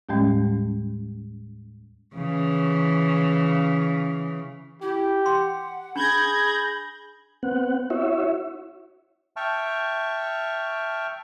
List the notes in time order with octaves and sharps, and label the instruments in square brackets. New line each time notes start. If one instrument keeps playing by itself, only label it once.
[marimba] D#2 A2 G3 G#3 C#4
[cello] C#3 E3
[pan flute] E4 [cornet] G4
[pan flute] F#5 [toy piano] C6
[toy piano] D4 [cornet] G#4 [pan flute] B5 [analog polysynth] G6 G#6 A#6
[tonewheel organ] B3 C4 F#5
E4 F#4 C#5 E5
[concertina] E5 G5 A5 C#6 F6